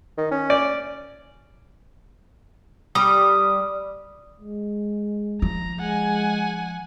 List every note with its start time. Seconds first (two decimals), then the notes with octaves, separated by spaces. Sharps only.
0.18 D#3
0.31 C#4
0.50 D5
2.95 G3 D#6
4.40 G#3
5.42 F3 A#5
5.79 G#3 F#5 G#5